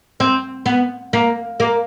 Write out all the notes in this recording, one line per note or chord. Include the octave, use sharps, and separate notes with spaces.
C4
B3
A#3
A#3